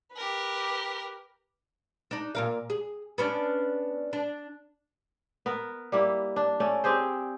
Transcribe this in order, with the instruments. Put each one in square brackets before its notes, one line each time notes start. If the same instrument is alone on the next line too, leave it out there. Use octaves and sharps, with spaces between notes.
[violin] G4 A#4 [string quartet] B4
[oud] D4 D#4
A#2 A#4 F5
G#4
B3 C#4 D4
D4
[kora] B3 A#4
G3 A#3 E4
D4
A3 C#4 D5
C4 G4 G#4 C5